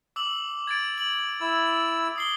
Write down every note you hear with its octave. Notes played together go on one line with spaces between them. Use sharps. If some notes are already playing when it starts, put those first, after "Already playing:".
D6 E6 F#7
G#6 A6 D7
F#7
E4 E6
D#6 C7 G7